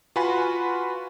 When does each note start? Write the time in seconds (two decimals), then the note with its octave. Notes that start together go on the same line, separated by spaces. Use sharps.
0.16 F4 F#4 B4 G#5 B5